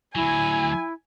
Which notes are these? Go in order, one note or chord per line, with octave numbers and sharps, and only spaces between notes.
D2 F#3 E4 G#5